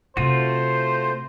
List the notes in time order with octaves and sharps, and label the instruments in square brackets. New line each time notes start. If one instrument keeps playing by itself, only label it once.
[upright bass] C3 [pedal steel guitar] A3 F4 F#4 [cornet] C5